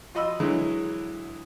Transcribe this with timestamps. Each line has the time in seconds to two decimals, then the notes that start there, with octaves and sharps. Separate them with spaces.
0.15 F4 F#4 D#5 B5 C6 E6
0.40 D3 E3 F#3 G#3 E4